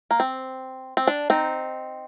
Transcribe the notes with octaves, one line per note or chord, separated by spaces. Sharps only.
A#3
C4
C4
D4
C4 D#4